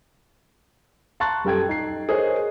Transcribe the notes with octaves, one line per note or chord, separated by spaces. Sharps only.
A5 A#5 C6 C#6 F#6 A6
F#2 G3 A4 G5 G#6
D#4 C7
G#4 A#4 C5 C#5 D#5